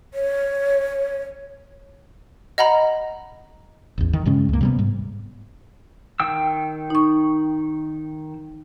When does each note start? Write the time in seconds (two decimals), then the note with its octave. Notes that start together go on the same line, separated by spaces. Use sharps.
0.14 C#5
2.58 D#5 F#5 A#5 B5
3.98 A1 E2
4.13 D#3
4.25 G2 C#3 G#3 C#4
4.49 C#2 A#3
4.61 C3 G3 B3
4.79 G#2
6.20 D#3 G5 E6
6.90 D#4 C#6